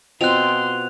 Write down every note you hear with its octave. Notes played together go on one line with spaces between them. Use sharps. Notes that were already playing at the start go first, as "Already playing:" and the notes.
B2 C4 F4 C6 F#6 F7